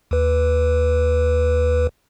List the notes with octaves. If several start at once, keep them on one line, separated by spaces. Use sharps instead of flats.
D#2 B4